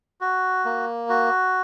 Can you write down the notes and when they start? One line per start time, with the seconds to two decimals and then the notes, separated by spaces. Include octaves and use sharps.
0.21 F#4
0.65 A#3
1.09 F#4